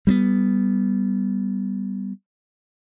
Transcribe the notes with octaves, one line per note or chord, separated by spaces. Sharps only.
G3 A3 B3